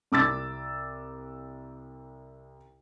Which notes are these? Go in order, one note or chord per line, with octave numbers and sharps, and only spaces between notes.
C2 D6 E6 A6